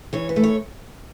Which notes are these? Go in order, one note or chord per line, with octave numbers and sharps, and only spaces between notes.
E3 C#5
B4
A3
C#5